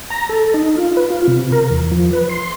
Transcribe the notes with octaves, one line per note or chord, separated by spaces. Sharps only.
A#5
A4
D#4
F4
B4
F4
C3
A#4
E2
F3
B4
C6